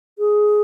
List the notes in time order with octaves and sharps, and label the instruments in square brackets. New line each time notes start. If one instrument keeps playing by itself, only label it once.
[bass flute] G#4